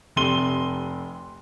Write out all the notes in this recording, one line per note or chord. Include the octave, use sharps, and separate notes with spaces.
F1 C3 C6 D#7 G7